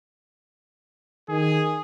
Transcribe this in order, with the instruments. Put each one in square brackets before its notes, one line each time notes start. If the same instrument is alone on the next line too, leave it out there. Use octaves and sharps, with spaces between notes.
[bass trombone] D#3 [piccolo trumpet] G#4